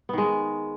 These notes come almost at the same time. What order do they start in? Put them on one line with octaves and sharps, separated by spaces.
B3 D#3 G#3